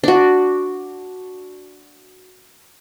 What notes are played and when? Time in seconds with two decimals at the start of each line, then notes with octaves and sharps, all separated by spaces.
0.03 D4 F#4